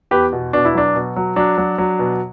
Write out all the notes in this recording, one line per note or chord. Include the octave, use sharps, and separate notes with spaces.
E2 G4 B4
B2
B2 D4
E4
F#3 D4
B2
F#3
F#3 D4
F#3
F#3
B2